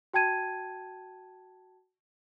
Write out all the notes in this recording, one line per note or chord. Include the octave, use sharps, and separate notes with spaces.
F#4 G5 A5 G#6 D#7